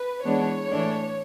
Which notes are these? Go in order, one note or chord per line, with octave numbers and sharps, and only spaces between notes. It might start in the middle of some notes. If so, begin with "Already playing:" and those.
Already playing: B4
E3 G#3 B3 D4 C#5
A2 E3 A3 D4